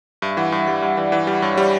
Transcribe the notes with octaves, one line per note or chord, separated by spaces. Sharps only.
G2 E5
E3 F#5
G2 E5
G3 F#5
G2 F#5
E3 D5
E3 F#5
G3 E5
G2 C#5
G3 C#5